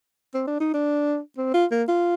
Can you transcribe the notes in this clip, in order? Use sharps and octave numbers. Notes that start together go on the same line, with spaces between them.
C4
D4
D#4
D4
C4
F4
A#3
F4